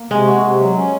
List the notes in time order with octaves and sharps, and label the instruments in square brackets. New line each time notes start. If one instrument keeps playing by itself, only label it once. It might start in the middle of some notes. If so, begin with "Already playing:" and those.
Already playing: [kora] A#3
[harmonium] C3 [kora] G#3
[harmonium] F#4
C3
F#3
C#4